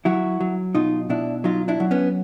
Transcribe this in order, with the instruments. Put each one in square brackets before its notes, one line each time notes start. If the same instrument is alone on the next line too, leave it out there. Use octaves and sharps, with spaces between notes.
[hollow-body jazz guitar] F#3 E4 F#4
F#3
B2 D#4 F4
B2 D4 E4
F#3 D#4 F4
D4 E4
F#3
B3 C#4